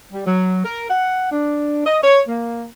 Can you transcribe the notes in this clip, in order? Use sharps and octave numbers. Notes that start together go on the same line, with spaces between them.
G3
F#3
A#4
F#5
D4
D#5
C#5
A#3